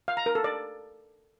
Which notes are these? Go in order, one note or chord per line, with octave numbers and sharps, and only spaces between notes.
F5
A#5
A#4
A4
D5